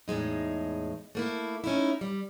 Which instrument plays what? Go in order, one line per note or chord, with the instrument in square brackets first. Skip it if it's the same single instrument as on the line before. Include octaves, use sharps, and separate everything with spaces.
[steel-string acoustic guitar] E2 A2 C#3 G#3 D#4
A3 A#3 E4
C#4 D#4 E4
G3